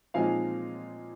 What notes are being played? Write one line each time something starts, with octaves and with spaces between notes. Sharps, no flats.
A#2 F3 G#3 C4 D#4 F5 G#5